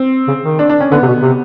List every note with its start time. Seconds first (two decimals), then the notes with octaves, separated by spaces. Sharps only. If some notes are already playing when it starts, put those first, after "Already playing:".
Already playing: C4
0.28 C#3
0.44 D#3
0.59 D4
0.69 D4
0.80 C#4
0.92 D3 B3
1.02 C3
1.07 B2
1.22 C3